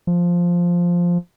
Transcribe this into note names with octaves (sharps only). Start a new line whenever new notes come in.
F3